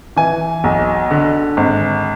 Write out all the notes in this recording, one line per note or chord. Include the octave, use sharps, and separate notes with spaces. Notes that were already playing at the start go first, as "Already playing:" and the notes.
E3 G#5
B1
D3
G#1